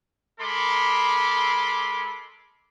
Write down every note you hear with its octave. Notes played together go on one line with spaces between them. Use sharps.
G#3 A4 A#4 B5 C6 D6